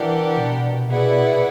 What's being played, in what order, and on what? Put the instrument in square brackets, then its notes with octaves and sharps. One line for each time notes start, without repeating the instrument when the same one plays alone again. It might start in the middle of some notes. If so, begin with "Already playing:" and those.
Already playing: [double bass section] E3 [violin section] D4 G4 A#4 D5 F#5
[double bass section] B2
[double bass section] B2 [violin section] E4 G#4 B4 D5 F#5